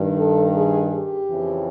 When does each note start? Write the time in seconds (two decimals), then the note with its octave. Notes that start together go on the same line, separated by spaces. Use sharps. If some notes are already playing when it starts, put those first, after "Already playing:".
Already playing: G2 D#3
0.17 A4
0.55 G#4
0.93 G4
1.30 F2 C#3 E3